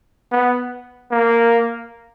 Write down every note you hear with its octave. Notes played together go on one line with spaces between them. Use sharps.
B3
A#3